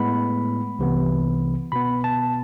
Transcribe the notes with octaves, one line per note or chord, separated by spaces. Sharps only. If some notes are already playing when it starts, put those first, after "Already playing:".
Already playing: A2 G#3 B3 B5
C2 C3 E3 B3
B2 B3 B5
A5